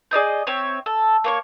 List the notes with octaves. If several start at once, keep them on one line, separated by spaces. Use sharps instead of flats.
G#4 D5 D#5 G6
C4 C#5 E5
A4
A#3 C#5 C#6